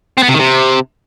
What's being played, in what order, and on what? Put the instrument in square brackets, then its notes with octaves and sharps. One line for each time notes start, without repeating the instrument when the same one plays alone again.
[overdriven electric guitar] C4
B3
C3
D#3
C3